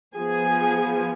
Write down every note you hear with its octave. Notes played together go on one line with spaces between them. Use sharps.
F3 B3 G#4 G#5